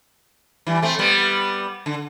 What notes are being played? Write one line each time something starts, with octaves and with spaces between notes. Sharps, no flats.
E3 G3
A3 C4
G3 B3
D3